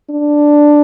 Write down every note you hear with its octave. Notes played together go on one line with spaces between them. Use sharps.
D4